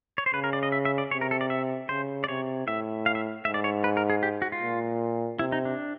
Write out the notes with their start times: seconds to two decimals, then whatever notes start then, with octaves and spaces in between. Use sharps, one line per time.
0.18 C#5
0.26 C5
0.34 C#3 B4
0.44 A#4
0.53 D5
0.63 D#5
0.72 E5
0.85 E5
0.98 D5
1.11 C3 C#5
1.21 A#4
1.31 A4
1.41 D5
1.50 E5
1.89 C#3 C5
2.24 D5
2.28 C3 C#5
2.67 A2 E5
3.06 F5
3.15 E5
3.45 G#2 E5
3.54 D5
3.64 C#5
3.84 B4
3.97 A#4
4.10 G#4
4.23 G4
4.42 F#4
4.52 F4
4.62 A#2
5.39 C3 E4
5.52 D#4
5.65 D4